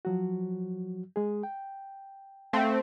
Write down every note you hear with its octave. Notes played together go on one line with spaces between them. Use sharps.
F3 F#3 F#4
G#3 G#4
G5
A3 C4 F5